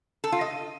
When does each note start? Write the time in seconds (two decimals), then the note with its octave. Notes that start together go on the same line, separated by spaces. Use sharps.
0.24 A4
0.32 F4
0.41 D#5